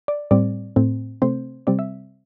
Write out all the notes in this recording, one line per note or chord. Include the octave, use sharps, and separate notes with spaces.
D5
A2 G3 C4 D5
A2 A3 C4
C3 A3 C4 C5
C3 G3 C4 D5
E5